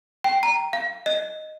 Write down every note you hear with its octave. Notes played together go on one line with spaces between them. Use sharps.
G5
A#5
F5
D#5